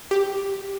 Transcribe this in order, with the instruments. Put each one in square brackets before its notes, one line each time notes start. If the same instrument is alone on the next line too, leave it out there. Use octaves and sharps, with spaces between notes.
[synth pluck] G4